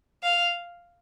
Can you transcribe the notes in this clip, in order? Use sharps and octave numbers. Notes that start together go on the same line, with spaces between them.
F5